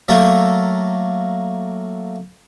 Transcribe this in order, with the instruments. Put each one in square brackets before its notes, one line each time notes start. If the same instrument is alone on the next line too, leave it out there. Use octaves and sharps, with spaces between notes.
[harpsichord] F#3 A3 A#3 A4